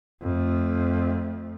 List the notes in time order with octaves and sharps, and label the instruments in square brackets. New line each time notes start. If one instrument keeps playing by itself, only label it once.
[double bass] F2 A3